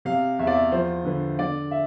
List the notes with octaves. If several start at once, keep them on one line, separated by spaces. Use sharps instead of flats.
C3 F5
E2 E5
D5
E5
F3 C5
D3 B4
D3 D5
E5